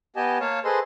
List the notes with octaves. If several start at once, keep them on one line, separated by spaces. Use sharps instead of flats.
B3 G4 D#5 G#5 A5
A#3 C#5 F5 A5
G#4 A4 B4 C5 D#5 C6